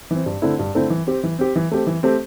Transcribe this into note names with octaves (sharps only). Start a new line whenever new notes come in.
E3 C4
G2
D3 A3 C4 E4
G2
D3 A3 C4 E4
E3
C4 G4
E3
C4 G4
E3
A3 C4 G4
E3
A3 C4 G4